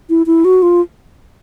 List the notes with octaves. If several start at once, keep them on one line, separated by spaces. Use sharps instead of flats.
E4
E4
F#4
F4